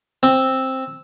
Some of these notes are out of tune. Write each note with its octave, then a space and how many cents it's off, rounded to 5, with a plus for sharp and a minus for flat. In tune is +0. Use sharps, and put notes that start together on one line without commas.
C4 +5